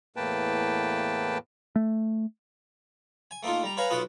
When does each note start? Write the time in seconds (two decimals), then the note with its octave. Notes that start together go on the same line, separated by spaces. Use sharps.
0.16 E2 A2 A#3 B4 G5 A5
1.76 A3
3.31 G#5
3.43 A3 A#3 D#4 F4
3.63 G3 A#5
3.77 B4 C#5 F5 G#5 A#5
3.90 B1 B3 F4 F#4 B4 D#6